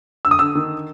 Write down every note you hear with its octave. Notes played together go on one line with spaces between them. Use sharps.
D3 E6
D#6
D3 E6
D#3